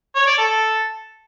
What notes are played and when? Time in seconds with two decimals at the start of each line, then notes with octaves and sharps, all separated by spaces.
0.15 C#5
0.27 D5
0.38 A4